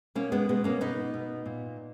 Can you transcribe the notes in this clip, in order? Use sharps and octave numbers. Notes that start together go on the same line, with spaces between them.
B2 A#3 C#4
G#3 B3
B2 G#3 B3
A#3 C#4
B2 B3 D#4
B2
A#2